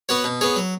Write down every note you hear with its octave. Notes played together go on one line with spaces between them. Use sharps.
B3 F#4 C#5
B2
B3 G#4 C#5
F#3